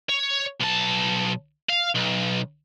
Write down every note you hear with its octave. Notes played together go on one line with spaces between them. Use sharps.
C#5
B1 A5
F5
B1